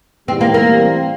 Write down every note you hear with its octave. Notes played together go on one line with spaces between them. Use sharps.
G#2 E3 G3 B3 C4
A#3
A#3
E3 G3 C4